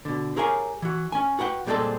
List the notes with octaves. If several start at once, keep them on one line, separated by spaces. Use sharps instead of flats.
B2 D3
G4 G#4 A#4 C#5 F5 G#5
E3 F#4
C#4 G#5
F#4 B4 F#5 G5
A#2 G3 G#3 C4 F#4 A4